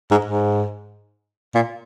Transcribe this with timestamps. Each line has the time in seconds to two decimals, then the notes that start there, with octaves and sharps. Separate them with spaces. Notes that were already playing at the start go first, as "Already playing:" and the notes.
0.11 G#2
0.25 G#2
1.54 A#2